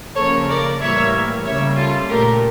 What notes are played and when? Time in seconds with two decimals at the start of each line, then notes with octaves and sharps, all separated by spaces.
0.16 C#3 F3 A#3 A4 C#5
0.48 A#4 D5
0.81 A2 E3 G3 A#3 C#5 E5
1.45 C#3 G3 A#3 C#5 E5
1.77 F4 A4
2.09 A#2 A3 G4 A#4